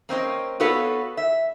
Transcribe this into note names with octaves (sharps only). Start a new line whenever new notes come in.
A#3 C4 C#4 D#5
B3 F#4 A4 B4 C#5 F5
E5